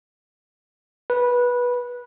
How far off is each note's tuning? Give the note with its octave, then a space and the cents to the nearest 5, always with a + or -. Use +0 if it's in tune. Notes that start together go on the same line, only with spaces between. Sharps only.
B4 -15